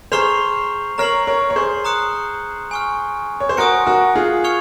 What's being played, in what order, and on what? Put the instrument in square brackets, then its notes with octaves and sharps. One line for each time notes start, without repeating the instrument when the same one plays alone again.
[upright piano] G#4 C5 [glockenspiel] A#5 C#6 F6 C7 F7
[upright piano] A#4 C#5 [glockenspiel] A#5 F6 C7 F#7
[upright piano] A#4 C#5
C#5
G#4 C5
[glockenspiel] A#5 D#6 F#6 C#7
G#5 C#6 F6
[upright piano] C#5
C5
[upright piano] F#4 A#4 [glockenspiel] G#5 D#6 F#6 C#7
[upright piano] F#4 A#4
F4 G#4
[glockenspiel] C#6 F6 G#6 C#7 F7